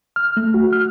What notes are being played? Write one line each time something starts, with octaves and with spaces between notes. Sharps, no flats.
F6
A3
F#4
F6